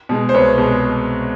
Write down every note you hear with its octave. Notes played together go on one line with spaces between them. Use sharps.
B2 G#3
C5
C2 B4 C#5
B2 G#3